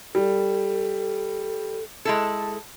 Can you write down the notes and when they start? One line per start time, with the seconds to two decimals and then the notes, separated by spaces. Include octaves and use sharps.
0.15 G3 A4
2.05 G#3 E4 A4